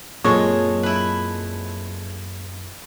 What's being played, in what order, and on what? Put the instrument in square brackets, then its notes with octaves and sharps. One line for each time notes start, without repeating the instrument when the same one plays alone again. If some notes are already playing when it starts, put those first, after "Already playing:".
[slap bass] F#2 F#3 C4 [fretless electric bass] A#2 [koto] G#3 A4 [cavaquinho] C#5 D#5
[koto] E4 B4